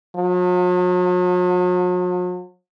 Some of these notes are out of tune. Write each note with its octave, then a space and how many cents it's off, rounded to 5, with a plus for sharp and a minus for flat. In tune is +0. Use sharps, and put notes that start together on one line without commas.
F#3 -45